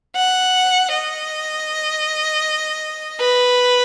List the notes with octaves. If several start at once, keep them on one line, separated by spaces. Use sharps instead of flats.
F#5
D#5
B4